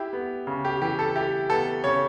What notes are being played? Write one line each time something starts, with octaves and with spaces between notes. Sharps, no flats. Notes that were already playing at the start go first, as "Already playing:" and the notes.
Already playing: E4 G4
B3
C#3
G4
E3 G4
A4
E4 G4
B3 A4
C#3 C#5